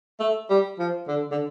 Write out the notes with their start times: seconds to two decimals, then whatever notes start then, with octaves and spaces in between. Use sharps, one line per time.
0.20 A3
0.50 G3
0.79 F3
1.08 D3
1.32 D3